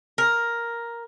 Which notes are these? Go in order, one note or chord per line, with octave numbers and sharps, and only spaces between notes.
A#4